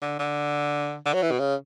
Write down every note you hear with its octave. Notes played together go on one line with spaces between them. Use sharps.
D3
D3
D3
F#3
E3
B2
C#3